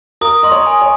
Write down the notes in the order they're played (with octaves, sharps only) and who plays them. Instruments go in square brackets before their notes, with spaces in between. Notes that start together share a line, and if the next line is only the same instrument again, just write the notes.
[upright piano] A#4 [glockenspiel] D#6
[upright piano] D#5 [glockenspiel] C6
[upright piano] C#5
[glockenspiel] G#5
[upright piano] C#5